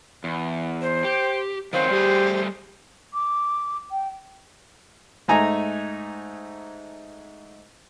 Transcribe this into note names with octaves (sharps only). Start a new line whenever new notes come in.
E2
C5
G4
D#3 F#3 C4 C5 F5
G3 A3 G4 G#4
D6
G5
G#2 A3 D#4 G#5 A#5